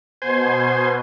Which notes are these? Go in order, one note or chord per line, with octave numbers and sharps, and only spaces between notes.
B2 C5 G#5